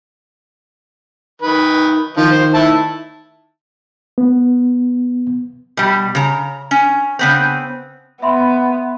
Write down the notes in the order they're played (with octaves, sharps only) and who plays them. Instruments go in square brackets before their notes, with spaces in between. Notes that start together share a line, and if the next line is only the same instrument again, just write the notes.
[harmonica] D#3 B4
[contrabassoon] D#3 [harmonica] F3
[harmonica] C5
E4 A5
[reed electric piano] B3
[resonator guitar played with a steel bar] B2 G3
C#3 A#5
C#4
C#3 B3 C4
[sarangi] B3 [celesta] E5 B5 C6